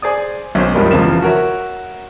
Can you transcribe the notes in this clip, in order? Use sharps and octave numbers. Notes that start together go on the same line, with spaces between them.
G#4 C5 D5 D#6
B1 C#4 C5
F#1 C#2 F3 G3 G#3 A#3
F1 E2 C#3 F3 E7
F#4 A#4 C#5 E5